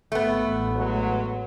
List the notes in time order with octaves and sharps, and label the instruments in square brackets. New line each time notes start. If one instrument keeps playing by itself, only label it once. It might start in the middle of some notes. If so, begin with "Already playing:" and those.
[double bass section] G#1 [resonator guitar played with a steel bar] A3 B3
[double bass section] A1
[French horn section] F#3 G#3 B4